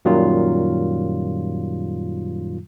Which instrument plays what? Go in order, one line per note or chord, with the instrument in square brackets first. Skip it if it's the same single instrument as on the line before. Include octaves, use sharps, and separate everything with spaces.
[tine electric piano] F#2 A#2 D#3 F#3 G3 F4